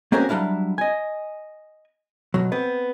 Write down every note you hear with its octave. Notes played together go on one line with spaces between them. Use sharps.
A#3 C4 C#4 F#4 G#4 A#4
F#3 G3 D4 E4 F5
D#5 G#5
B2 F#3
B3 C4